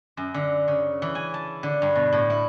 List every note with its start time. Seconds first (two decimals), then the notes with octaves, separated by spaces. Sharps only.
0.17 F#2
0.34 D3
0.68 C#3
1.02 E3
1.15 G#5
1.34 A5
1.63 D3
1.82 G2
1.95 B2
2.12 A2
2.30 E4